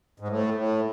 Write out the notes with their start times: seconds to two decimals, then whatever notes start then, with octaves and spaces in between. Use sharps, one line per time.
0.20 G#2
0.28 A2
0.54 A2